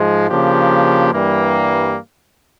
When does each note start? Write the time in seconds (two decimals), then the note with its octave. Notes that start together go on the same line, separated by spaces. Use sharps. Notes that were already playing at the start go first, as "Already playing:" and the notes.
Already playing: G#2 F3 G#3
0.28 C#3 F3 A#3 D4 G4
1.12 G2 E3 G3 A#3